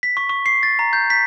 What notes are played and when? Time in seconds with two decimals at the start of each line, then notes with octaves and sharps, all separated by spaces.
0.03 B6
0.17 C#6
0.29 C#6
0.46 C7
0.63 A6
0.79 A#5
0.93 G6
1.10 B6